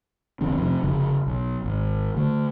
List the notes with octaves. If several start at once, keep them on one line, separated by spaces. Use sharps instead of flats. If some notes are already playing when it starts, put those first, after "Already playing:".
F1 D#3 C4 D4
F2 C3
F1 C#3
B1
G#1
D3 A3